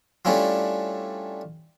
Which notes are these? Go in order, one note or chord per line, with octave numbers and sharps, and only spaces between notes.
G3 A3 C#4 D4 E4 F4